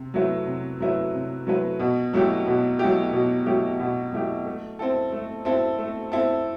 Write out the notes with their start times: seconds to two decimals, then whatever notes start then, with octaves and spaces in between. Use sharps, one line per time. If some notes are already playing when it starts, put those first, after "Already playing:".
Already playing: C3
0.14 F#3 A3 E4 B4
0.47 C3
0.80 F#3 A3 E4 B4
1.13 C3
1.47 F#3 A3 E4 B4
1.79 B2
2.13 F#3 A3 E4 G4
2.47 B2
2.79 F#3 A3 E4 G4
3.13 B2
3.46 F#3 A3 E4 G4
3.80 B2
4.13 F#3 A3 E4 G4
4.45 A3
4.79 C4 E4 A4
5.12 A3
5.45 C4 E4 A4
5.79 A3
6.12 C4 E4 A4